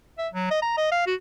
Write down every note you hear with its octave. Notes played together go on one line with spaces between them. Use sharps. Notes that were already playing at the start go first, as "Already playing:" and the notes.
E5
F#3
D#5
A#5
D#5
F5
F#4